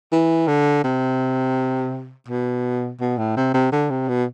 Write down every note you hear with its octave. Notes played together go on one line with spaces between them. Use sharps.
E3
D3
C3
B2
B2
A2
C3
C3
D3
C3
B2